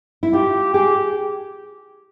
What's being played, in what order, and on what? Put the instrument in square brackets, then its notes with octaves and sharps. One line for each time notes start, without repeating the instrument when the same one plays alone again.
[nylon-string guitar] E4
[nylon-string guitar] F4 [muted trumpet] G4
[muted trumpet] G4 [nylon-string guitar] G#4